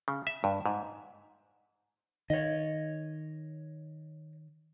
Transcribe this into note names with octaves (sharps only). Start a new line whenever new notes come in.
C#3
E5
G2
G#2
D#3 C#5 D#5